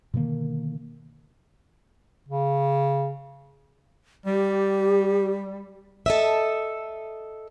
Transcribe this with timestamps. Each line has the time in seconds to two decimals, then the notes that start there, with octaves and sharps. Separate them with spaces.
0.14 B2 D3 D#3 A#3
2.29 C#3
4.26 G3 G4
6.06 A4 D#5 E5